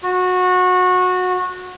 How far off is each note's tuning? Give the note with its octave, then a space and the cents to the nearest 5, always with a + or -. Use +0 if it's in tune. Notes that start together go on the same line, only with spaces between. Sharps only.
F#4 -20